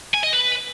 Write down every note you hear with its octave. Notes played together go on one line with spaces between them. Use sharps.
G#5
D#5
B4